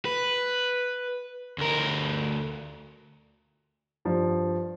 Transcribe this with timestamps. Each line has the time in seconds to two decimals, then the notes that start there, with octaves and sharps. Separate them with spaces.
0.05 B4
1.58 D2 A#4
4.05 G2 F3